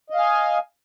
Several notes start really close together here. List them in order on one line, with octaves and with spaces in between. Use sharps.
D#5 F5 G#5